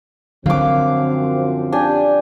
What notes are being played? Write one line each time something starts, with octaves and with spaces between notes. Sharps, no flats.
F#2 D3 F3 F#3 C4 F5 D6
D4 G4 G#5